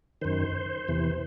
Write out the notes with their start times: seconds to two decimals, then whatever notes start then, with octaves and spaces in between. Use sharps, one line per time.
0.21 F#2 D#3 C5
0.88 E2 C3 E3